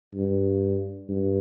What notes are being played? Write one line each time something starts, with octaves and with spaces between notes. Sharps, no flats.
G2
G2